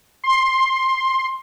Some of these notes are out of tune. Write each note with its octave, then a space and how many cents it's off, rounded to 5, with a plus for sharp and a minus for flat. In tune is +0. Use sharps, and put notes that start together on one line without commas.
C6 +15